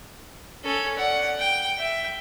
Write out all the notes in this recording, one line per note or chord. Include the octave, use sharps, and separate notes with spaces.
C#4 A4
D5 F#5
G5
E5 G5